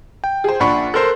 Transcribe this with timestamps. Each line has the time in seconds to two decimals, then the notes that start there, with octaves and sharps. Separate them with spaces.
0.24 G5
0.44 G#4 C5
0.60 A#1 D4 F#5 B5 C#6
0.94 A4 A#4 C5 C6 F#6